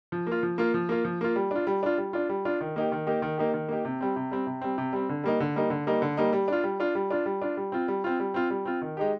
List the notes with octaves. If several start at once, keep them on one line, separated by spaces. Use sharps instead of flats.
F3
A#3 F4
F3
A#3 F4
F3
A#3 F4
F3
A#3 F4
G3
D4 F4
G3
D4 F4
G3
D4 F4
G3
D4 F4
D#3
A#3 D#4 G4
D#3
A#3 D#4 G4
D#3
A#3 D#4 G4
D#3
A#3 D#4 G4
C3
G3 C4
C3
G3 C4
C3
G3 C4
C3
G3 C4
D3
G3 A#3 D#4
D3
G3 A#3 D#4
D3
G3 A#3 D#4
D3
G3 A#3 D#4
G3
D4 F4
G3
D4 F4
G3
D4 F4
G3
D4 F4
G3
C4 F4
G3
C4 F4
G3
C4 F4
G3
C4 F4
D#3
G#3 D#4 G4